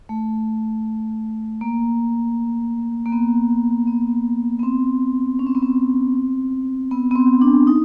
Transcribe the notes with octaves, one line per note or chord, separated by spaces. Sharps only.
A3
A#3
A#3
B3
B3
B3
C4
C#4
C4
B3
C4
B3
B3
C4
D4
D#4